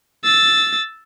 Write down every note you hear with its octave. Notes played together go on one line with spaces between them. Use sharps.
E6 A6